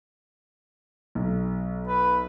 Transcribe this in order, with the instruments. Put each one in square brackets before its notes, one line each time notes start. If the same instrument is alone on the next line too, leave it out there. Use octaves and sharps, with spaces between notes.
[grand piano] B1
[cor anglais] B4